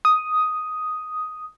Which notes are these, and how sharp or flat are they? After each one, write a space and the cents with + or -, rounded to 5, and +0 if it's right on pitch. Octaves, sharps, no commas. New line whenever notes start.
D#6 +5